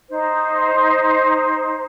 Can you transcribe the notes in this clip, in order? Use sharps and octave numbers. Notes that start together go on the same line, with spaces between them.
D#4 C5